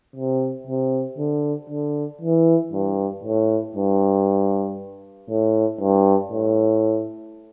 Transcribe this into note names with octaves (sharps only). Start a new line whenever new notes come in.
C3
C3
D3
D3
E3
G2
A2
G2
A2
G2
A2